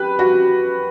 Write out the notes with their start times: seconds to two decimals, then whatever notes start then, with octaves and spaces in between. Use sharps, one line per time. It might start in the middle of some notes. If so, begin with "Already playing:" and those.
Already playing: G4 B4
0.19 F#4